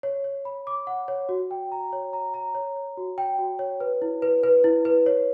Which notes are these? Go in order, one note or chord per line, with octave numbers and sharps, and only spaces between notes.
C#5
C#5
B5
D6
F#5
C#5
F#4
G5
A#5
C#5
A#5
A#5
C#5
C#5
F#4
G5
F#4
C#5
B4
E4
B4
B4
E4
B4
C#5